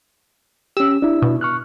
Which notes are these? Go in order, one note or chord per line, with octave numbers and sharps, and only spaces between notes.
C#4 G4 E6
D4 E4
B2
C#6 F6 F#6